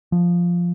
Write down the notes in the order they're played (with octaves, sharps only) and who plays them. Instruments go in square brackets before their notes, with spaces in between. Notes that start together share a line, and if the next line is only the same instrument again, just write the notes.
[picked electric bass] F3